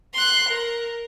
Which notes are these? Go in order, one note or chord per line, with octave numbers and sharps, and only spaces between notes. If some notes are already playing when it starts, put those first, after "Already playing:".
C6 F#6
A#4